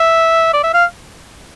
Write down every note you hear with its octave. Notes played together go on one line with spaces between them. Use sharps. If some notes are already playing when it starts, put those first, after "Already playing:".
Already playing: E5
D5
E5
F5